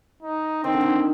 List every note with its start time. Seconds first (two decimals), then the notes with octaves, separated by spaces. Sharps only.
0.23 D#4
0.64 D#3 C4
0.73 D3
0.81 D#3